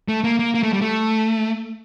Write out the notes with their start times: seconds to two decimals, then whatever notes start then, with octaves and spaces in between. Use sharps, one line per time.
0.08 A3
0.24 A#3
0.39 A#3
0.54 A#3
0.63 A3
0.73 G3
0.81 A3